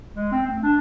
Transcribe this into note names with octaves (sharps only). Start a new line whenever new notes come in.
G#3
C4
A3
D4